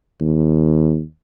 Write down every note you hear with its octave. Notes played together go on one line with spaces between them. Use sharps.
D#2